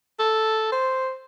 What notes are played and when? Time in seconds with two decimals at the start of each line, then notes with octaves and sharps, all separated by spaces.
0.20 A4
0.72 C5